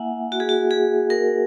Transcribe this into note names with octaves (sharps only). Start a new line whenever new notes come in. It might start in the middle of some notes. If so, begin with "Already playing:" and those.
Already playing: A#3 E4 E5 F#5 G#5
F#4
G#4
F#4
G#4
A#4